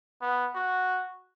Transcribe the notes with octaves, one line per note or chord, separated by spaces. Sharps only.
B3
F#4